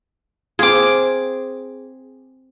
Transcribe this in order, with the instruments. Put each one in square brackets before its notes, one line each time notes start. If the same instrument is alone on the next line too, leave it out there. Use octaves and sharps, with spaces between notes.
[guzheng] C4 F4 [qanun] G#4 D6